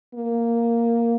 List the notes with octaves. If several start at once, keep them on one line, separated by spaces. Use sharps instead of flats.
A#3